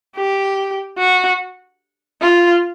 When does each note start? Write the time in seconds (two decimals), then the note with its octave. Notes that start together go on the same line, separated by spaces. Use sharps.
0.16 G4
0.98 F#4
2.21 F4